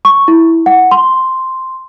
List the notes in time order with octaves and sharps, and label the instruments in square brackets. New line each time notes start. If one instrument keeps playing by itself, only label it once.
[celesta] C#6
E4
F#5
C6